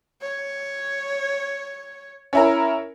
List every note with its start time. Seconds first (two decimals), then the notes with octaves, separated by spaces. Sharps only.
0.22 C#5
2.33 C#4 E4 A#4